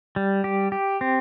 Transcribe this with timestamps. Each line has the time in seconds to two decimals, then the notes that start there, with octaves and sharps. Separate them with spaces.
0.16 G3
0.44 G4
0.72 G4
1.01 C4